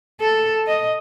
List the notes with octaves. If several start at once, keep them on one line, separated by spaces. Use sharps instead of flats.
A4
D#5